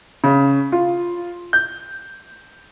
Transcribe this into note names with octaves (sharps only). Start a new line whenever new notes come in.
C#3
F4
G6